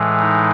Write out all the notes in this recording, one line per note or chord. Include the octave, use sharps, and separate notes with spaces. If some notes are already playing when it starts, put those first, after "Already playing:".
Already playing: A2 E3 G#3
D#4